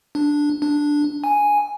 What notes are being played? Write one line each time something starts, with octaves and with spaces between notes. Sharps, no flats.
D4
D4
G#5